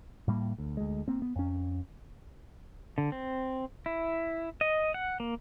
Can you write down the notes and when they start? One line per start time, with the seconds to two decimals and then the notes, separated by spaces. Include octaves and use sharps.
0.28 A2 G3 A#3
0.58 D2
0.77 D2 G#3
1.08 A#3 C4
1.22 B3
1.36 F2 C#4
2.98 D3
3.12 C4
3.86 E4
4.61 D#5
4.94 F#5
5.20 A#3